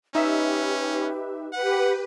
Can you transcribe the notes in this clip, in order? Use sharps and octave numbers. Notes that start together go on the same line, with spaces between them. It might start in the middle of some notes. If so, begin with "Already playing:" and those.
C#4 D#4 G4 B4 E5
G4 B4 F#5